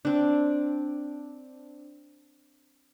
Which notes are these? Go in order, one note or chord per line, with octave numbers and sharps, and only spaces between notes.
C4 D4